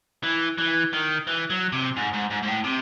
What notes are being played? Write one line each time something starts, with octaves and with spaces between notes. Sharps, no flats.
E3
E3
D#3
E3
F#3
C3
G#2
G#2
G#2
G#2
A2
C3